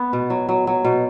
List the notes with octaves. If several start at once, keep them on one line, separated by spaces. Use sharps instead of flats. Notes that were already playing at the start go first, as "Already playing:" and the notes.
Already playing: B3
B2
F#3
F#3
F#3
B2